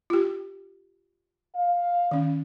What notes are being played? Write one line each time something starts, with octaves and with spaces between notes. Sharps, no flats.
F4 G4
F5
D#3 C#4